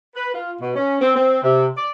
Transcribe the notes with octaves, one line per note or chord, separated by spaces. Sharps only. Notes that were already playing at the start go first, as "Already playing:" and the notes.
B4
F4
B2
C#4
C4
C4
C3
D5